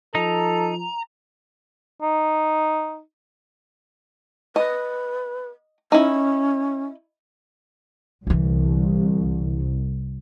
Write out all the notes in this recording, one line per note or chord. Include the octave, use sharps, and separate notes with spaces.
F3 D#4 A4 A#5
D#4
B4 D#5
C#4 D#4 E4
C2 D3 E3